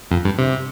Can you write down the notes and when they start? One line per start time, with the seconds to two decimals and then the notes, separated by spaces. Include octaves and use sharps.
0.11 F2
0.25 G2
0.39 C3